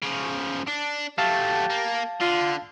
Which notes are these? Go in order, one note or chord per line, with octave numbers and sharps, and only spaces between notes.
C#3 F3
D4
F#3 A3 G4 F5 A5 A6
A#3
D3 F4